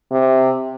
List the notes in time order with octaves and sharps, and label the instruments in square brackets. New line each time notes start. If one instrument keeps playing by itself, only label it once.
[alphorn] C3